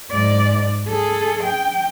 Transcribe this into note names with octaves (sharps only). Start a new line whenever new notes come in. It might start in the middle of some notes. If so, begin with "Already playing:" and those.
G#2 D5
G#4 A4
G5